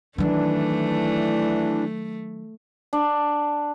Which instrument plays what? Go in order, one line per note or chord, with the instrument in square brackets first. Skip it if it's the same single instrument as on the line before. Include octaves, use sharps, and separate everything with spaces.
[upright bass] D#3 F#3 [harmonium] E3 D4 [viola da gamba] A3
[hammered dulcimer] D4